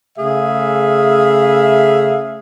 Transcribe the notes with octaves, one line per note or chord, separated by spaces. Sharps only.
C#3 A3 G#4 E5 F5